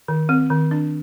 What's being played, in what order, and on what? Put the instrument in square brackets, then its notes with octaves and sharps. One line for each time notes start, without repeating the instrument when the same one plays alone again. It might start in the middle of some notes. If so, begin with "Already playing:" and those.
[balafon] D#3
C4
D#3
D4